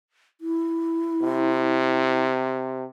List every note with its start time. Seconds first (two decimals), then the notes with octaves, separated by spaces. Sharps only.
0.41 E4
1.22 C3